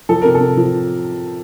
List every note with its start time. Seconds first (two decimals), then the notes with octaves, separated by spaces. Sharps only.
0.09 F3 A4
0.22 C3 A#4
0.35 A4
0.40 C3
0.57 F3